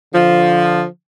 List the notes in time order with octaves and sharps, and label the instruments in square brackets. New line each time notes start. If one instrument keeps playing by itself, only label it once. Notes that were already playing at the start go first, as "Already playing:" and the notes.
[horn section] D3 F3